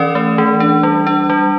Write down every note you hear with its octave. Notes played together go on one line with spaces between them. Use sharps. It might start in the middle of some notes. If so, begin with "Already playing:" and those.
Already playing: E3 C#4 A#4 D5
A3
E3
D4
G3
D4
G3